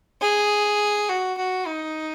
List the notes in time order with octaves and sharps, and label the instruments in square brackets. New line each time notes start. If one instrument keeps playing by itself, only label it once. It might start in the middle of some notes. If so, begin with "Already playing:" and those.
[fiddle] G#4
F#4
F#4
D#4